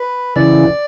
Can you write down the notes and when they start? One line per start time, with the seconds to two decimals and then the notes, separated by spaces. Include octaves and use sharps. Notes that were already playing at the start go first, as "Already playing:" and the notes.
Already playing: B4
0.36 C#3 E3 D5